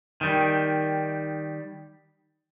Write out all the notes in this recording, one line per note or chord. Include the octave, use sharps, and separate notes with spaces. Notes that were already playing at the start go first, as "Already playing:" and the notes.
D#3 G3